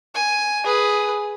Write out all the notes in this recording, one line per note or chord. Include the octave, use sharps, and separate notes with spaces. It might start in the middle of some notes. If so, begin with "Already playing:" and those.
G#5
G#4 B4